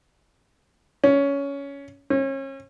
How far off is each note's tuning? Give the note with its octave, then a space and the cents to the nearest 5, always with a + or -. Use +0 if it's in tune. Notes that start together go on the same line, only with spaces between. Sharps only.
C#4 +15
C#4 -35